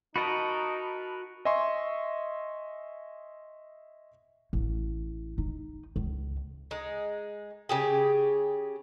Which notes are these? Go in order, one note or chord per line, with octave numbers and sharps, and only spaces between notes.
D#4 F#4 A#4 D#5 A5 B5
D#5 E5 G#5 C6 C#6
A1
D#4
C#2
G#3 D#4
C#3 G4 G#4